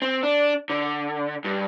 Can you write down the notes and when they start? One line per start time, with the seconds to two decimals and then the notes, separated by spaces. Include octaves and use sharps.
0.02 C4
0.23 D4
0.70 D3
1.44 G2